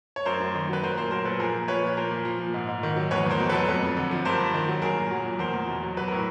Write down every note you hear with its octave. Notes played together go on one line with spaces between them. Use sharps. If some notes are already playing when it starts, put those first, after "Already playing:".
C#5
F#2 A#4 C5
F#2
D#3
F#3 B4
F#3 A#4 C5
A#2 A#4 C5
F#3 A#4 C5
A#2 A4 B4
F3 G#4 A#4
A#2
F3 B4 C#5
A#2
F3 A#4 C5
A#2
F3
A#2
G#2
G#2
D#3
F#3
E2 B4 C#5
E2 A#4 C5
B2
A4 B4
F#3
F2 A4 B4
F2
D3
F3
G2 A#4 C5
G2
D#3
F#3
F#3 G#4 A#4
A#2
F#3
A#2
E2 A#4 C5
E2
B2
F#3
F#3 B4
A2 A#4